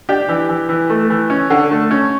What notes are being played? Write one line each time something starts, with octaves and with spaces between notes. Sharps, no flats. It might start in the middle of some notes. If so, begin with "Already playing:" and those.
D4 G4
E3
E3
E3
A3
E3
C#4
D3
A3
C#4